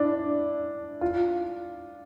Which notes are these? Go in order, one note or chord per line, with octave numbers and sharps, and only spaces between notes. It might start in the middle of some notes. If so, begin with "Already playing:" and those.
Already playing: D4 E4
F4